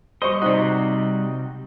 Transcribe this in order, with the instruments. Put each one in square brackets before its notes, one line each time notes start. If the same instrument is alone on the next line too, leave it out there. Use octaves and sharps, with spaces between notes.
[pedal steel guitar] G3 D#5 [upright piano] C5 C#6
[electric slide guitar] C3 F#4 [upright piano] D#4 D5